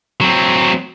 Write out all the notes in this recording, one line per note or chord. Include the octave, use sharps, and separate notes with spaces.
F#3 C4